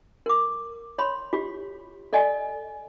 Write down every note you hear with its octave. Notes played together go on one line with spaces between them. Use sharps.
A#4 D6
C#5 B5 C6
F4 G4
A4 D5 D#5 G#5